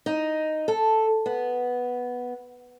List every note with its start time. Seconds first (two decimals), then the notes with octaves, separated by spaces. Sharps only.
0.06 D#4
0.68 A4
1.26 B3